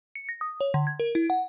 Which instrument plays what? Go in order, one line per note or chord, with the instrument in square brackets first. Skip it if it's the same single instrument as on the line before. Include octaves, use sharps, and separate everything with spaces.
[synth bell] C#7
A#6
D#6
C#5
D3
G#6
A#4
E4
F#5